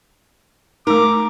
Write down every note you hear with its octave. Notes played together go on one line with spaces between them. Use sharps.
A3 D#4 A#4 D6